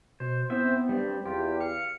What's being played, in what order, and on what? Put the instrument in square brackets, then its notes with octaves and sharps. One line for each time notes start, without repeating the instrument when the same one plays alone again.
[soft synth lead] B2 [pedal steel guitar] C5
[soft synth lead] B3 [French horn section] C4 E4 [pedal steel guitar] C5 E5
[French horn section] G2 [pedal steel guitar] G3 C4
[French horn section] E2 [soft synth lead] F4 [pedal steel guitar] G4
[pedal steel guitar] F5 [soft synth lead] C#7